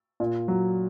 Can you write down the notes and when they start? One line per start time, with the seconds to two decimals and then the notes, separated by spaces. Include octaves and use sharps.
0.20 A#2
0.48 F#3